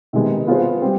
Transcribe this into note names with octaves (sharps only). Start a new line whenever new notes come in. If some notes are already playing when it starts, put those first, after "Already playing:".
C3 D#3 G#3 B3 D#4
B3 F4 G#4 C5
G3 C4